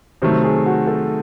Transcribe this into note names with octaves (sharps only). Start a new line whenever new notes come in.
C3 D#3 F#3 A3 C5
G#4
F#4
A4